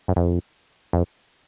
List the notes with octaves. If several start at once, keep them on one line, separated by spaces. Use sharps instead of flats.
F#2
F2
F2